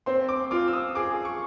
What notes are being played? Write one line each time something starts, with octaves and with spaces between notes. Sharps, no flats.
C4 C6
D6
F4 D6
E6
D#6
G#4 D6
C#6